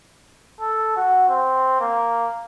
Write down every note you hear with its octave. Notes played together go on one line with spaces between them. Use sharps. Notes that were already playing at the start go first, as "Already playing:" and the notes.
A4
F#4
C4
A#3